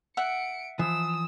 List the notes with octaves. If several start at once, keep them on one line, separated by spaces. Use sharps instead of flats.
E5 F#5 C#7 D7
E3 F3 D#6 E6